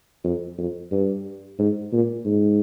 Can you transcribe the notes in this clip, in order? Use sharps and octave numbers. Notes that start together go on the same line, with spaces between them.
F2
F2
G2
G#2
A#2
G#2